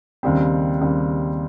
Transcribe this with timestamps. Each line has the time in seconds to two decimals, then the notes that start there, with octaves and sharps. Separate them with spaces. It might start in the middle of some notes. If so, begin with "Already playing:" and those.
0.23 D#2 C#3 G3 C4
0.81 D#2 C#3 G3 C4